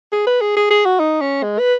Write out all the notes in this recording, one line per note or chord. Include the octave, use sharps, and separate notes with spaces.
G#4
B4
G#4
G#4
G#4
F#4
D#4
C#4
G#3
B4